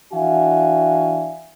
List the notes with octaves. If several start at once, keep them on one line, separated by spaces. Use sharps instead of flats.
E3 D4 F#4 E5 F5 G#5